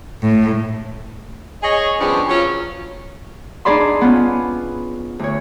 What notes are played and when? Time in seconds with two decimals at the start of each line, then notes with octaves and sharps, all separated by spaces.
0.22 A2
1.62 G#4 C#5 D#5
1.99 F3 G3 B3 C#4 D4 G#4
2.28 F#3 C#4 F4
3.65 D4 D#4 G#4 D5 B5 C6
4.01 B3 C#4 F4
5.19 D2 C#5